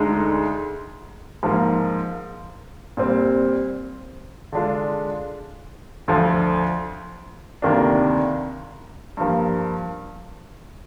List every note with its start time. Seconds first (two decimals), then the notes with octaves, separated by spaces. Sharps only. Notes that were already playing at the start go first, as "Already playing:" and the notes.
Already playing: D2 D3 G#3 D#4
1.43 G#2 F3 A#3
2.97 A#2 G3 C4
4.52 D3 G#3 D4 F4
6.08 D2 D3 F3
7.62 D2 C3 D#3 A#3 D4
9.17 G2 F3 A#3